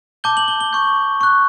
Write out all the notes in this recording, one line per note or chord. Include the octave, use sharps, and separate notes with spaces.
A5 D6 G6 G7
F#7
G7
G7
C#6 G6
C#6 F#6